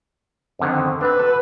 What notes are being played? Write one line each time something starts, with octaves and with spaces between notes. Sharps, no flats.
F2 D3 D#3 C4
C4 D4 B4
F#4 A4